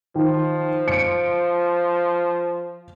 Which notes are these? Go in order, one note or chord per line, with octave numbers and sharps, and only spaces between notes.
D#3 F3
C#7 D7